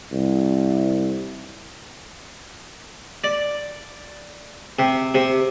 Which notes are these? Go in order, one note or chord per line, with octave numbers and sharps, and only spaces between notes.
C2
D5
C3
C3